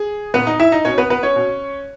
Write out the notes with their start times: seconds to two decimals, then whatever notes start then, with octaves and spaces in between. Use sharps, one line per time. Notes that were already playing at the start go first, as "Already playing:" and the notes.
Already playing: G#4
0.34 A#2 B3 B4
0.47 D#4 D#5
0.60 E4 E5
0.72 D#4 D#5
0.85 B2 C#4 C#5
0.98 B3 B4
1.10 B3 B4
1.23 C#4 C#5
1.36 B2